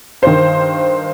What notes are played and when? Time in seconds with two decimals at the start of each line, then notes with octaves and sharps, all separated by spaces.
0.22 G2 D#3 C5